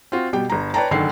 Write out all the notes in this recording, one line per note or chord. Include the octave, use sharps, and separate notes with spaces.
C4 F4 F#4
B2 G3 G4 G5
G1 A#5
B4 C#5 D5 G5 A5 A#5
F#1 D3 D#3 C7